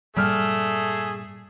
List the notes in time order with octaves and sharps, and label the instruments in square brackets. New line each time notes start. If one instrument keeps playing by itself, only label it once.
[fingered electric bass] G2 A#2 [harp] G3 F6 [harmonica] A3 [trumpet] G#4